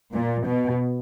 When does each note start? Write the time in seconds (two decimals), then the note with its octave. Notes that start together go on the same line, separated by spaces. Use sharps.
0.14 A#2
0.47 B2